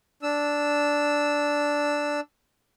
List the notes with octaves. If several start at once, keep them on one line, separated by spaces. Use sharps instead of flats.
D4 E6